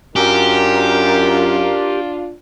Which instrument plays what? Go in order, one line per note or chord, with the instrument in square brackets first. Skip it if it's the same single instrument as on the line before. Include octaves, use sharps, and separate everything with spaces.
[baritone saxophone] F#2 [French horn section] D4 F4 [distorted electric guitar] G4 [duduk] A#4